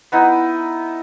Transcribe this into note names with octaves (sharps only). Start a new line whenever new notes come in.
B3 D#4 E4